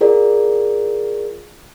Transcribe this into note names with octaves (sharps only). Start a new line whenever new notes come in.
F4 G#4 A#4 D5